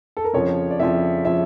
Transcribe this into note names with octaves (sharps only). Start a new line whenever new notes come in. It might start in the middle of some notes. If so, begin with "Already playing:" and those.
A4
A#4
F2 C#3 F3 C#5
D5
F2 C#3 F3 E5
C#3 F3 E5